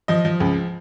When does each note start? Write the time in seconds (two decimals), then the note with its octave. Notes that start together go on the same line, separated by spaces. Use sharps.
0.08 F3 D#5
0.25 F3
0.40 C#2